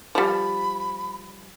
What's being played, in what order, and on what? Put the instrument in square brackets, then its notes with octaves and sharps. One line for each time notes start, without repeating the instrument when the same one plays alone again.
[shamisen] F3 G3 [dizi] B5